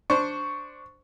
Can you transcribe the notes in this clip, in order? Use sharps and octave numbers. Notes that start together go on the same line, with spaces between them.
D4 C5 C#6